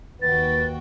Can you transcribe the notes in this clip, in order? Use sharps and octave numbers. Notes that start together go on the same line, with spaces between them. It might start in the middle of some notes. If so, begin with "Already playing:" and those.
D#2 F#4 B4 G5 A6